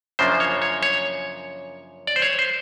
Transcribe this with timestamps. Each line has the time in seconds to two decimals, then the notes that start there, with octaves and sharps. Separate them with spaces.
0.19 F#2 C#3 F3 A#3 D4 C5
0.40 C#5
0.62 C#5
0.83 C#5
2.07 D5
2.16 C5
2.22 C#5
2.39 C5